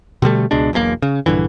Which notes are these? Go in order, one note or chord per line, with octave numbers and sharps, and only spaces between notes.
B2 D3 G3 A3
C#2 B2 G#3 D4
E1 B1 A2 A#3
C#3
A#1 G2 D3 E3